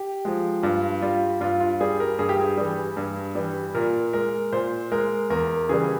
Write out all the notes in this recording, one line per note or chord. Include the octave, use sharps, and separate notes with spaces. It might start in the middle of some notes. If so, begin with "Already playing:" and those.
Already playing: G4
F3 G#3
G2 F4
G3 F4
G2 F4
F4
G3 G#4
A#4
G2 G#4
G4
G#4
E3 G3
G2
E3 G3
A#2 A#4
G#3 A#4
A#2 C5
G#3 A#4
E2 A#4
C#3 E3 G3 G#4